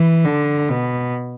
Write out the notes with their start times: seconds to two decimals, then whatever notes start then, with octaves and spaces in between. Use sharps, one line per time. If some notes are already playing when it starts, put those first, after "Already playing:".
Already playing: E3
0.24 D3
0.70 B2